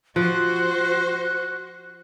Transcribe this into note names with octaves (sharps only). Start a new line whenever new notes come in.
F3 F#4 C5 F#6